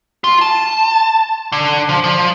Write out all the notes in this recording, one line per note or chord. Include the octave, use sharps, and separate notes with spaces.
F4
A5
D3
F3
F3